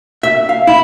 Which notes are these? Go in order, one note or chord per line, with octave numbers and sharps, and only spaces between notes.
E5
F5
E4